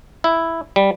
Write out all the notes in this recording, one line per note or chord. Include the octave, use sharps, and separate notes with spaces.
E4
G3